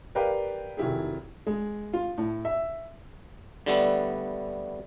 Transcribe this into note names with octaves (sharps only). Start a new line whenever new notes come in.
G4 A#4 B4 D5 F5 G5
F1 D#3 F#3 E4 G4 G#4
G#3
F4
A2
E5
D3 G3 A3 B3